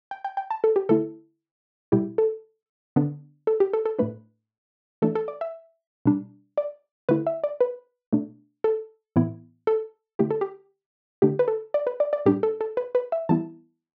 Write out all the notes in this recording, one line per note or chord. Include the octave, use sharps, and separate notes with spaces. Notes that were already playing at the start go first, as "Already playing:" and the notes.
G5
G5
G5
A5
A4
G4
D3 A3 E4 A4
B2 G3 E4 G4
A4
D3 B3 D4
A4
G4
A4
A4
A2 A3 D4 B4
E3 A3 D4 A4
A4
D5
E5
B2 G3 D4
D5
D3 A3 E4 B4
E5
D5
B4
B2 A3 D4
A4
A2 E3 B3 E4
A4
D3 A3 E4 G4
A4
G4
D3 A3 D4 G4
B4
A4
D5
B4
D5
D5
A2 G3 D4 G4
A4
A4
B4
B4
E5
E3 G3 B3 E4 A5